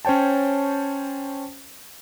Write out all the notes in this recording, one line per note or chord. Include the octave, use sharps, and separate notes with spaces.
C#4 C5 C#5 G5 A5